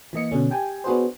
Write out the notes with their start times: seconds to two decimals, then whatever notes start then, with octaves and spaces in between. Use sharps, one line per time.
0.13 E3 A#3 D#5 C#7
0.32 B2 D3 C#4
0.50 G4 G5 G#5
0.84 B3 D4 F#4 G#4 B4 C5